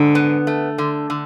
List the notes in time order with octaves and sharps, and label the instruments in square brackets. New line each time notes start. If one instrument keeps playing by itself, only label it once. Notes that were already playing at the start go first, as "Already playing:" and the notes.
Already playing: [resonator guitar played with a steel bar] G#2 [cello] D3
[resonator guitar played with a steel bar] B3
A3
D3
D3